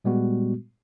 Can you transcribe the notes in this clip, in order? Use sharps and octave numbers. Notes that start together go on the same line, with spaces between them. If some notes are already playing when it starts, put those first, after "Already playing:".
A#2 G3 G#3 B3 F#4